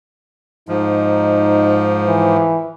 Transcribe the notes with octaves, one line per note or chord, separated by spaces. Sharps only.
G#2 F3 D#4
E3